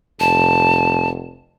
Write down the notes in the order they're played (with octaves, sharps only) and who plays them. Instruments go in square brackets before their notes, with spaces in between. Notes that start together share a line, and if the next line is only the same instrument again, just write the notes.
[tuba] F1 [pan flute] A5